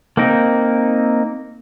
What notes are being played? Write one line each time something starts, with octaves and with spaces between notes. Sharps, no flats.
A#3 C4 D#4 A#4